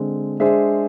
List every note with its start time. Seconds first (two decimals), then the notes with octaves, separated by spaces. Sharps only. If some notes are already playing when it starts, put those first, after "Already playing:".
Already playing: D3 G#3 C4
0.40 G#3 D4 G#4 C5 E5